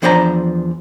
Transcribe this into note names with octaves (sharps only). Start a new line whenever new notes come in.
E2 F3 D4 C5 C#5 A#5